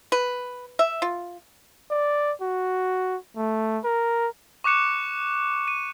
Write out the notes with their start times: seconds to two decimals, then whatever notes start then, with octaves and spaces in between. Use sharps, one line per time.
0.12 B4
0.79 E5
1.02 F4
1.91 D5
2.42 F#4
3.37 A3
3.85 A#4
4.64 C#6 D6 F#6 C#7 E7
5.68 D#7